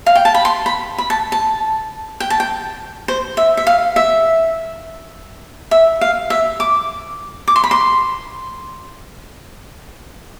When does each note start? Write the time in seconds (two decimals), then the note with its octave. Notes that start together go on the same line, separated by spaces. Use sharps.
0.06 F5
0.15 G5
0.25 A5
0.35 B5
0.45 C6
0.66 B5
0.98 B5
1.10 A5
1.32 A5
2.20 G5
2.30 A5
2.40 G5
3.08 C5
3.37 E5
3.57 E5
3.67 F5
3.96 E5
5.71 E5
6.01 F5
6.30 E5
6.60 D6
7.48 D6
7.56 C6
7.64 B5
7.71 C6